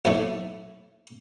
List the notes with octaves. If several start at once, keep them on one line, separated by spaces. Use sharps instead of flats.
B1 A2 E3 A3